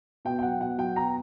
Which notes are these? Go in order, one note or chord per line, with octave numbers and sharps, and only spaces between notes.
B2 G5
G5
F#3 F#5
B2 F#5
F#3 G5
B2 A#5